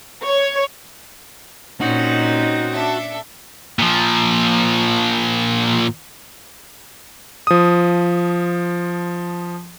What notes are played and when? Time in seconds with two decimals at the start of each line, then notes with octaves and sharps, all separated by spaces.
0.25 C#5
1.81 A#2 C4 C#4 D#4 F#4
2.72 D4 A4 E5
3.78 A#2 F3
7.47 F3 D#6